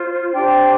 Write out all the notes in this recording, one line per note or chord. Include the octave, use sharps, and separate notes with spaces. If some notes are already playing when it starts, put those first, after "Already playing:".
Already playing: F4 C5
D4 G4 C5 G5